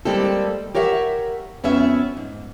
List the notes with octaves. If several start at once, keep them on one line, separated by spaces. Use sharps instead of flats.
G3 G#3 A#3 C4 G4 A4
G4 A#4 C#5 E5 F#5
F2 B3 C#4 G#4 E5
G#2